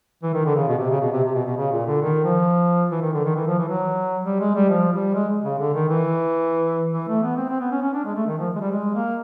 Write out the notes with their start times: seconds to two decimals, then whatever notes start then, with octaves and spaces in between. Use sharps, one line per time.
0.23 E3
0.34 D#3
0.46 D3
0.56 C#3
0.68 B2
0.79 C3
0.90 C#3
1.01 B2
1.13 C3
1.23 C3
1.35 B2
1.46 B2
1.57 C#3
1.72 A#2
1.86 D3
2.02 D#3
2.24 F3
2.91 E3
3.02 D#3
3.13 D3
3.24 D#3
3.35 E3
3.47 F3
3.58 E3
3.68 F#3
4.25 G3
4.40 G#3
4.55 G3
4.70 F3
4.92 G3
5.14 G#3
5.44 C#3
5.59 D3
5.74 D#3
5.89 E3
6.93 E3
7.08 A3
7.23 B3
7.37 C4
7.49 C4
7.60 B3
7.71 C#4
7.82 C#4
7.93 D4
8.05 G#3
8.16 A3
8.27 D#3
8.38 F3
8.56 G#3
8.60 G3
8.72 G#3
8.94 A#3